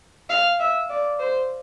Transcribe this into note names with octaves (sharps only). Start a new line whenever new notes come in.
F5
E5
D5
C5